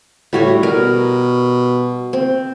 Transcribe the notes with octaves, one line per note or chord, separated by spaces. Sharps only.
A2 G3 F#4 C#5
B2 A#4
C4